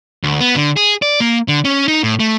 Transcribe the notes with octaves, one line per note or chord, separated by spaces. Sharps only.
D2
B3
D3
G#4
D5
A#3
D3
C#4
D#4
A2
A3